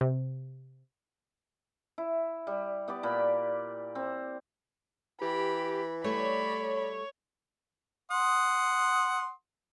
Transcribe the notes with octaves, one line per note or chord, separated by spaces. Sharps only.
C3
E4
G3
B3 G4 D5
A#2 B5
C4
E3 G4 B5
G3 A3 C#5 D5 B5
F#5 C6 D#6